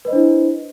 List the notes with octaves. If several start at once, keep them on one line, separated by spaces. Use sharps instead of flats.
D4 E4 B4 C5 D#5